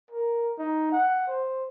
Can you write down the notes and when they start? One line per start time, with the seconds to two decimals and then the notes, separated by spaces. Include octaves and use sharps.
0.10 A#4
0.58 D#4
0.92 F#5
1.27 C5